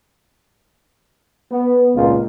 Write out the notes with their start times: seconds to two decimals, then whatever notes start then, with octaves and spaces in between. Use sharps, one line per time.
1.52 B3
1.96 G#1 C#2 A#2 F4